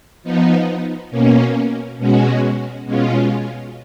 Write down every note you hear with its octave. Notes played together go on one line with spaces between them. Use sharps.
F3 B3 D#4
B2 A#3 C#4
B2 G#3 C#4 F#4
B2 G#3 C#4 F4